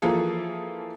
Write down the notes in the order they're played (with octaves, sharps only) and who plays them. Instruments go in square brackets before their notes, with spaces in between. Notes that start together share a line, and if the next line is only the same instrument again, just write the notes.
[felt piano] E3 F3 A#3 F4 G#4 A4